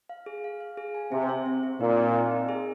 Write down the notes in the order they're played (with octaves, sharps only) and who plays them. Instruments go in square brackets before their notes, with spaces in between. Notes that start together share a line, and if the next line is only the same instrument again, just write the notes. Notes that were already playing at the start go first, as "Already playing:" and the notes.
[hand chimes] F5
G#4
F5
F5
G#4
G#5
[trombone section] C3 [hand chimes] C4
[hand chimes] C5
C4
C4
[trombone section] A#2 [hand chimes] D#4
[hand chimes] D#4
C4
D#4
G#4